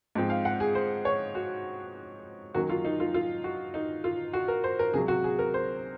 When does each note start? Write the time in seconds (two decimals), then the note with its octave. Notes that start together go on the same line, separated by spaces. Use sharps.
0.15 G#2 F3 C4
0.30 F5
0.45 F#5
0.60 G#4
0.75 C5
1.05 C#5
1.35 F#4
2.54 F#2 D#3 F#3 A#3 F#4
2.69 F4
2.85 D#4
3.00 F4
3.14 F4
3.44 F#4
3.74 D#4
4.04 F4
4.33 F#4
4.48 A#4
4.64 C5
4.79 A#4
4.93 C#2 C3 F#3 G#4
5.08 F#4
5.24 G#4
5.39 A#4
5.54 C5